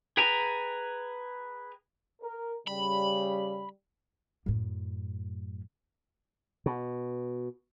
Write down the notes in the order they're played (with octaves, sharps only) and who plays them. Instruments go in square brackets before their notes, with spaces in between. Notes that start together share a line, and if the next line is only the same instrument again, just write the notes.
[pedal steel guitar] G#4 B4 G5 G#5 A#5
[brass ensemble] A#4
[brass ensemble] C#3 G3 [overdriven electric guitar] B5
[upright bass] F#2 A2
[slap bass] B2